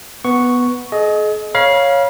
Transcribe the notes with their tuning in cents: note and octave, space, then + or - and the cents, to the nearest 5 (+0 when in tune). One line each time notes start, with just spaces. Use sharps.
B3 +0 C#6 +0
G#4 +40 D#5 +0
C#5 +0 F5 +0 B5 -40